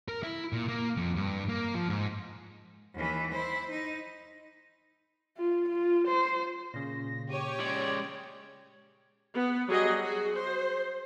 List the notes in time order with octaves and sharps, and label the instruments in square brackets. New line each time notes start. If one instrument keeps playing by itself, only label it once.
[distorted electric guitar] A#4
E4
A#2
A#3
F2
G2
A#3
F3
G#2
[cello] D#2 E3
E4 C5
D#4
[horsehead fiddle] F4
F4
C5
[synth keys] A#2 C#3 [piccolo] A#6
[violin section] G4 C#5 [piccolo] D#7
[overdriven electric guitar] G#3 D5 [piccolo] G#6
[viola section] B3
F#3 G3 F#4 G#4 D#5
F#4 G#4
C5